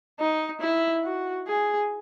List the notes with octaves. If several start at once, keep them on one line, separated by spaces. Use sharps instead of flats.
D#4
E4
F#4
G#4